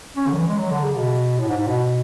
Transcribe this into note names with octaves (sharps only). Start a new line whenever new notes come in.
C#4
D3
F#3
E3
G#3
F#3
D3
C#3
B2
A2
G#2
G#2
B2